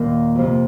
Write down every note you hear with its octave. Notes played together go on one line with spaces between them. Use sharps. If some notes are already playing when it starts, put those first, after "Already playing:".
Already playing: D#2 A#2 D#3 A#3 A#4
F2 C3 F3 A#3